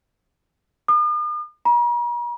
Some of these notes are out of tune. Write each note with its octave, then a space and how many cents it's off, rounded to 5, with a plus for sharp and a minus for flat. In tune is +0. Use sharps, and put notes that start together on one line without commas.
D#6 -45
A#5 +45